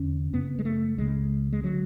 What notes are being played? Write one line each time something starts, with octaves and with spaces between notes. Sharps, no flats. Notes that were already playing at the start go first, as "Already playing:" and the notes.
Already playing: E2 D3 C#4
F#2 C#3 B3
G#3
A3
C#2 C#3 G#3
G#3
D3 F#3